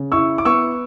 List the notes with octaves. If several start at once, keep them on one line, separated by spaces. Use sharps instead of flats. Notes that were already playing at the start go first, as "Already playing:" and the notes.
Already playing: C#3
E4 C#6 E6
D6
B3 C#6 E6